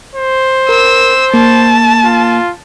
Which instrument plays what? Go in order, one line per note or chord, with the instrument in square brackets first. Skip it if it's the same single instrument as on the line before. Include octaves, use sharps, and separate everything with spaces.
[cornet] C5
[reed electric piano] A#4 [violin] E6
[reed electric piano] A#3 [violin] A5
[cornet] F4